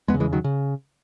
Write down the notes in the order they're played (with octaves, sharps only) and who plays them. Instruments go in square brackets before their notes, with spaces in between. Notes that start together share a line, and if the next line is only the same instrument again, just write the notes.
[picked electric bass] E2 G#3 B3
C#3
E3 G#3
D#3 F#3
C#3